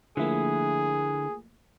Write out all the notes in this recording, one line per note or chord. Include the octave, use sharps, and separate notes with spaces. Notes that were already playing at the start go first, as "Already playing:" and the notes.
D3 F3 A3 A#3 E4 G#4